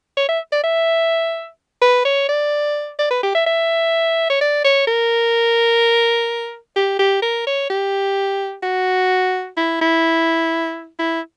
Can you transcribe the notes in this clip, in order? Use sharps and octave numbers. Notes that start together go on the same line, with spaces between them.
C#5
E5
D5
E5
B4
C#5
D5
D5
B4
G4
E5
E5
C#5
D5
C#5
A#4
G4
G4
A#4
C#5
G4
F#4
E4
E4
E4